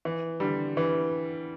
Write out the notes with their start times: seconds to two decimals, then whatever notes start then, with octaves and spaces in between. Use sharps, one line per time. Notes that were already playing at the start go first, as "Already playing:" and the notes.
0.05 E3
0.40 D3 G3
0.77 E3